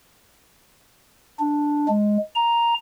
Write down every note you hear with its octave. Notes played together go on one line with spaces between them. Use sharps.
D4
G#3
A#5